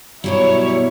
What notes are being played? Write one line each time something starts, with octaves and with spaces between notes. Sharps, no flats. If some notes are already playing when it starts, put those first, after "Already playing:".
B2 F#3 G3 E4 C#5